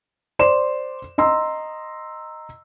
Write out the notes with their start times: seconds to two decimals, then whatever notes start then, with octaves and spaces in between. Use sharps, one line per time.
0.39 C5 D5 C6 E7
1.18 D#5 A#5 C6 E6